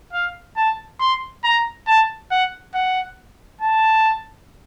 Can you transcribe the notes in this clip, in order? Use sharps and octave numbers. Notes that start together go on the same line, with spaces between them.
F5
A5
C6
A#5
A5
F#5
F#5
A5